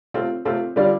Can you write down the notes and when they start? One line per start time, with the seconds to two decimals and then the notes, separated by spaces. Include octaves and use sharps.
0.14 C3 A3 C4 F4
0.45 C3 A3 C4 F4
0.76 D3 G3 F4 D5